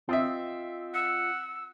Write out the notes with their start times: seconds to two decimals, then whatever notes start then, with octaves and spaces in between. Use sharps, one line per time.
0.09 C4 F4 D#5 E5
0.94 F#5 E6